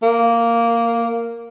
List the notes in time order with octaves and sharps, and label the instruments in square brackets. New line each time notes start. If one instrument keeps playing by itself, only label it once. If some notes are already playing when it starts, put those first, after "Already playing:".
[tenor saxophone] A#3